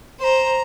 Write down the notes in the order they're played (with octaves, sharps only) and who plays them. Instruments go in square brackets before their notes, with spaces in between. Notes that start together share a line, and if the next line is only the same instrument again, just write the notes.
[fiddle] C5 [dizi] A#5 C6